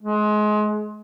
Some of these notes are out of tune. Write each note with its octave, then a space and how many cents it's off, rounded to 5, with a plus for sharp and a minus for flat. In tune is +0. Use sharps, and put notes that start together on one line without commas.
G#3 +25